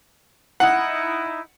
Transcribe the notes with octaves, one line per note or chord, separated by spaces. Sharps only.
D#4 E4 F#5